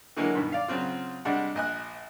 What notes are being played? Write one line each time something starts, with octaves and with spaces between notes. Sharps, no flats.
D3 E3 F#3 G#3 A#3
G2 B2 D#3
D5 F5
C#3 F#3 C4 F4
C3 G3 G#3 D4 F#4 F#5
A#1 D#5 G#5 F#6